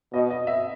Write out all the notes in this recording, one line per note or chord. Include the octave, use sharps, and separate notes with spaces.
B2 D#5
D#5
E5